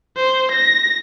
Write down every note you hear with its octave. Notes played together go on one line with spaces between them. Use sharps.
C5
A#6